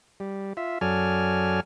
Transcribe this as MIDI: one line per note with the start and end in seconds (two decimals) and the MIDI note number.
0.20 0.53 55
0.57 0.78 65
0.57 0.78 76
0.81 1.60 42
0.81 1.60 54
0.81 1.60 69
0.81 1.60 74
0.81 1.60 80
0.81 1.60 89